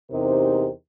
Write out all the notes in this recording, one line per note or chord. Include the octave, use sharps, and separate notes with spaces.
E2 C3 D#4 G4 A#4 C5